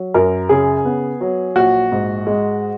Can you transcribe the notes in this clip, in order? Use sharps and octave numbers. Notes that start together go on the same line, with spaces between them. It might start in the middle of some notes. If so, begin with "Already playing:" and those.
Already playing: F#3
F#2 A#4
C#3 G#4
B3
F#3
A#1 F#4
G#2
G#3